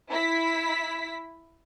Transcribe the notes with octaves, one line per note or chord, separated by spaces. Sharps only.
E4 B6